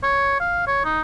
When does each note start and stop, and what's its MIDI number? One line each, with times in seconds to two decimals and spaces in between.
0.03 0.37 73
0.40 0.65 77
0.68 0.81 73
0.85 1.02 63